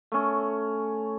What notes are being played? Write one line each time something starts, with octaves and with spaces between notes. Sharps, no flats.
A3 C#4